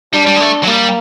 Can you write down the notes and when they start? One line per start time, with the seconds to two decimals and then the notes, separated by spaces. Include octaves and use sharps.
0.13 G3 D4
0.27 G3
0.36 G#3
0.41 A3
0.63 F#3
0.66 G3 A#3